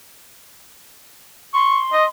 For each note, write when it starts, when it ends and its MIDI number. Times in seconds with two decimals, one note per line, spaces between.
1.54 2.06 84
1.54 1.79 85
1.93 2.05 75